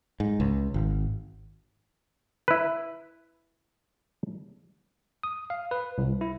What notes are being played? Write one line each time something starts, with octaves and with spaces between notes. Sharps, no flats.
G#2
C#2
G#1
E4 B4
D#6
F5
B4
C2
E4